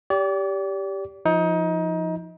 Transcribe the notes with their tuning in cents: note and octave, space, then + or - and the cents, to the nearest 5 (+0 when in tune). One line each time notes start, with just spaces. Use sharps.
G4 +0 D5 -35
F3 +0 D#4 +25